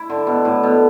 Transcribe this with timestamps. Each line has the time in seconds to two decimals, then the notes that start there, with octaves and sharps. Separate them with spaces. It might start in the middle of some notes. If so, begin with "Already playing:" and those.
Already playing: E4
0.09 D3
0.27 B2
0.45 A2
0.63 B2